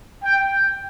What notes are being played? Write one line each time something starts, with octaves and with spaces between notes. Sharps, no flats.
G5